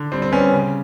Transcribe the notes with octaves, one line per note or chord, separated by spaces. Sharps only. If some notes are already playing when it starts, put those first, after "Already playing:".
Already playing: D3
G3 C4
C4
G3 B3 C#4
C#3